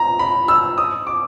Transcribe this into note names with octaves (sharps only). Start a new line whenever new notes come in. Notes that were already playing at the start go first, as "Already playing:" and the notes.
Already playing: A#5
B5
E6
D#6
D6